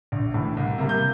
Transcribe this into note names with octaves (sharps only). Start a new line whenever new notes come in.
A#1
A2 E3
C2
C3 G3 A#3
G6